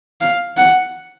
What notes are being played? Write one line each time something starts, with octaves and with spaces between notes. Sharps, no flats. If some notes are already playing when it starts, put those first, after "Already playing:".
F5
F#5